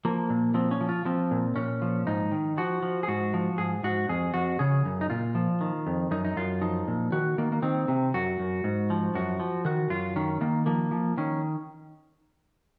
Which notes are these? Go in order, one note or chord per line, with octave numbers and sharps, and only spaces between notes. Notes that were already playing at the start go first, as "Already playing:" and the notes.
F3 A#3
A#2
F3 C4
C#4
F3
F4
F3 C4
A#2
A#2 C#4
F3
G#2 D#4
D#3
F3 F#4
F3
G#4
G#2 F#4
F3
G#2 G#4
G#2 F#4
F2 G#4
F2 F#4
C#3 G#4
F#2
D#4
A#2 F4
F3
D#3
F2
F#2 D#4
D#4
F#2 F4
F3 D#4
A#2
D#3 F#4
D#3 A#3
A#3
D#3 C4
C3
F#2 F#4
F#2
G#2
F3
F#2 F#4
F3
D#3 F#4
F#2 F4
D#3 C#4
D#3 A#3
F3 A#3
F3
D#3 C#4